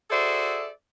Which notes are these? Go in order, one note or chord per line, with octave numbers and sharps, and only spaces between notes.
F#4 G#4 A4 C5 D5 E5